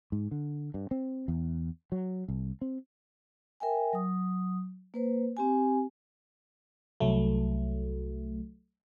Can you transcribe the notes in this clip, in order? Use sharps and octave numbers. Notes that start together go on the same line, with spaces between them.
G#2
D3
G2
C4
E2
F#3
C2
C4
A#4 E5 G5 G#5
F#3 D#6
A#3 B4 C5
C4 G4 G#5
C2 F#3 A3